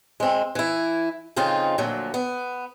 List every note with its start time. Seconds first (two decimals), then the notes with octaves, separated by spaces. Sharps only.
0.20 G#3 C4
0.55 E3 E4
1.36 F2 C#3 C4 D#4 F4
1.78 D2 A#2 F3 F#3
2.14 B3